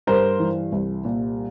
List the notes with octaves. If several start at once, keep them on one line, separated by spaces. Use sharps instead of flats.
G2 A#4 C5
E3
C2
A#2